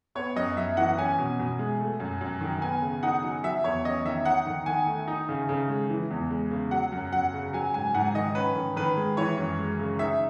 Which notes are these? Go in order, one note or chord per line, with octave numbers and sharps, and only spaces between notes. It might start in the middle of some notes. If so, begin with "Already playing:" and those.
B3 C#5
F#2 D#5
F#2 E5
E3 F#5
C#4 G#5
B2
B2
G#3
A3
F#2
F#2
D#3
B3 G#5
C#3
D#4 F#5
F#3
F#3 E5
E2 C#5
C#4 D#5
D#3 E5
D#4 F#5
D#3
D#3 G#5
A3
D#4
C#3
C#3
G#3
E3
E2
G#3
C#3
F#3 F#5
F#2
F#2 F#5
C#3
F#3 G#5
G#2 G#5
G#2 F#5
D#3 D#5
C#4 B4
D#3
D#3 B4
G#3
E3 C#5
F#2
G#3
C#3
D#4 E5